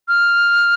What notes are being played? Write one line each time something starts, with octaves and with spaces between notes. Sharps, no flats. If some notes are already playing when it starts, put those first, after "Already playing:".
F6